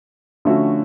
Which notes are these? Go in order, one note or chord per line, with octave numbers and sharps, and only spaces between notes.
D3 F3 A3 C#4 F#4